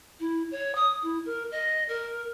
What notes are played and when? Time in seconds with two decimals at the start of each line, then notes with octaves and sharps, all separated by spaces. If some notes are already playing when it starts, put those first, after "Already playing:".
0.19 E4
0.51 C#5
0.75 D#6
1.02 E4
1.25 A#4
1.51 D#5
1.88 A#4